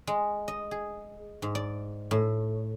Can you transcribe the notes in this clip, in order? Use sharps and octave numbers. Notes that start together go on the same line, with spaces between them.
G#3
D#5
G#4
G#2
D5
A2